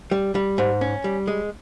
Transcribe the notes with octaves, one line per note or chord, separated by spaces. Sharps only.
G3
G3
G#2
C#4
G3
G#3